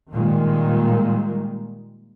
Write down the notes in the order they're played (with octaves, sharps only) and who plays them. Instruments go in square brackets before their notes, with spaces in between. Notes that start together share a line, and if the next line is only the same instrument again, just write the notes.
[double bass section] A#2 D#3 G3 G#3